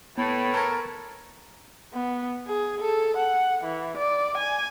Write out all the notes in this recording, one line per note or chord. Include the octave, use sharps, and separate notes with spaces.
A2 B3 B4 A5
A4 A#4 A#5 C#6 G#6
B3
G#4
A4
F#5
E3
D5
G#5